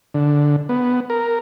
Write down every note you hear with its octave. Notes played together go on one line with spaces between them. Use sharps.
D3
B3
A#4